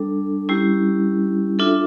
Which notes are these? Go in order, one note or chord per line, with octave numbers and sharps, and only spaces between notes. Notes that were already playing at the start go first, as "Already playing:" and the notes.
Already playing: G3 D4 A4
G3 C#4 E4 G4
D4 F4 A4 E5